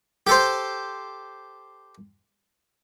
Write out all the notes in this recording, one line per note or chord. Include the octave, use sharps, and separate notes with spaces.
G4 A4 C5